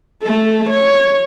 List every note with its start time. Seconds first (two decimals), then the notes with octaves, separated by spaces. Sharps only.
0.22 A3 A4
0.69 C#5